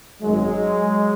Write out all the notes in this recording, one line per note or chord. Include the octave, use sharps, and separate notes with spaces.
G#1 F#2 D#3 F#3 G#3